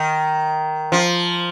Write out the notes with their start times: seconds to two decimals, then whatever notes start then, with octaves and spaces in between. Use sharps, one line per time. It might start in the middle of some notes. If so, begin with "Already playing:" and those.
Already playing: D#3
0.92 F3